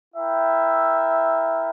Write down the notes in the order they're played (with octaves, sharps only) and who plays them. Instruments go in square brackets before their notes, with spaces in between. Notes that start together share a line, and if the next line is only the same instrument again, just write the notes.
[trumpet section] E4 A#4 E5 G5